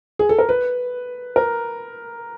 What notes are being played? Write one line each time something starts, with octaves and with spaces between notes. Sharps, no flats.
G#4
A4
A#4
B4
A#4